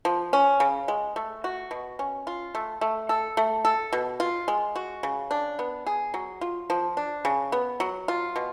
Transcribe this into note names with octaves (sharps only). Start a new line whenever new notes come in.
F3
C#4
C#3
G#3
A3
F#4
B2
C#4
F4
A3
A3
A4
A3
A4
B2
F4
G#3
F#4
C#3
D4
B3
G#4
F#3
F4
F3
D4
C#3
B3
F#3
F4
B2